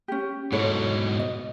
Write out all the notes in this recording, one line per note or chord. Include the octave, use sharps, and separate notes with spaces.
C#4 G4
G#2 B2 E4 A4 C#5
D#5